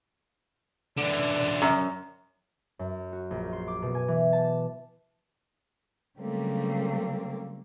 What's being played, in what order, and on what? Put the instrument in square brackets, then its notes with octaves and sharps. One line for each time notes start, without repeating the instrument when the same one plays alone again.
[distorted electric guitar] D3 E3 [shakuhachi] D5
[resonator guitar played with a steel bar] F#2
[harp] F#2
F#4
A#1
C6
D6
B2
G#5
E3
A5
[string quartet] C#3 F#3 G3 A3 A#3 C4